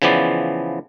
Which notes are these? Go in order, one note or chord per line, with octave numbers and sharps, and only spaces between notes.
C#3 E3 F3 B3 D5